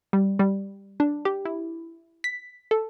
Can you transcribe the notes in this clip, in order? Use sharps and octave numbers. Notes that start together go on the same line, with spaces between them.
G3
G3
D4
G4
E4
B6
A4